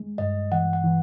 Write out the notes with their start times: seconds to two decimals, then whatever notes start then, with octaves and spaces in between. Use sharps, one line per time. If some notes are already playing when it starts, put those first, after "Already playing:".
Already playing: G#3
0.18 G2 D#5
0.52 E3 F#5
0.73 F#5
0.84 E3